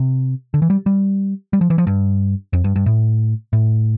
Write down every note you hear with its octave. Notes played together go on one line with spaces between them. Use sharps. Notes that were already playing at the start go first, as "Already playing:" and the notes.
Already playing: C3
D3
E3
G3
G3
G3
F3
E3
F3
G2
F2
G2
G2
A2
A2